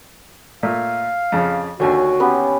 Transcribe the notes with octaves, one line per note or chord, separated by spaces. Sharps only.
A#2 A3 F5
F2 C#3
D#2 D3 F#4 C#5 G#5
B3 C#4 G4